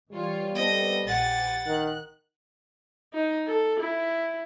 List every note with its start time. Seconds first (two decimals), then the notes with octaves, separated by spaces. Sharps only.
0.11 E3 G3 F4 C#5
0.55 B3 C4 A4 D#5
1.08 A#1 G4 F#5 G#5 A6
1.66 D#3 F#6
3.13 D#4
3.47 A4
3.80 E4